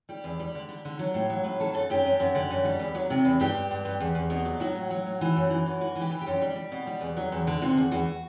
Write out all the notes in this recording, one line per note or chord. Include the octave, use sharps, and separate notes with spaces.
G3 G4
E2
G3
D3
G3
D3
F#3
A2
F#3
A2
F#3 A4
F#2 A4
F#2 G4
F#2
F#2
D3
F#2
G3
E2
F#3
C3
E2
G2 G4
G2
G2
G2
E2
E2
B2
F#3
F#3 F#4
A2
F#3
A2
E3
F#2
E3
F#2
E3 F#4
E3
G4
E3
G4
F#2
G3
G3
B2
G3
E2
F#3
E2
D3
C3 F#4
E2
E2 F#4